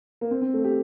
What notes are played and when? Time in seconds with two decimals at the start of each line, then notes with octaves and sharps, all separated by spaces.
0.21 A#3
0.31 C4
0.42 C4
0.54 A3
0.64 G4